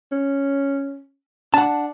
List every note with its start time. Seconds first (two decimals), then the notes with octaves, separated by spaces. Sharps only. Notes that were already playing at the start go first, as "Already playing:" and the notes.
0.12 C#4
1.54 D4 F#5 A5